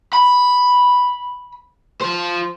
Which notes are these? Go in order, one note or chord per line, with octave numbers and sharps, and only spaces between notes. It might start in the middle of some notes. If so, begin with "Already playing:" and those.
B5
F3 C5